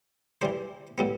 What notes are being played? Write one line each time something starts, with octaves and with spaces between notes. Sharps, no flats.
E3 G3 D4 C5
A2 G3 B3